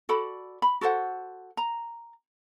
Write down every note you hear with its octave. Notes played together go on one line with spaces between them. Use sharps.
F#4 A4 D5 B5
B5
F#4 A4 C5 F#5
A#5